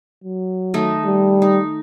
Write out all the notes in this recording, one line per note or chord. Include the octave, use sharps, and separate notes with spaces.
F#3
D#3 A3 D#4
G3
D#4